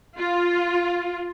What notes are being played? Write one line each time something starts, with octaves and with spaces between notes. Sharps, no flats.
F4